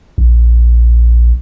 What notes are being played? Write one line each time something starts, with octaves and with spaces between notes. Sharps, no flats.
A#1